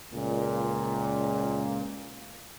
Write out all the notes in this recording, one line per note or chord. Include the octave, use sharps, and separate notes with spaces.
C#2 A#2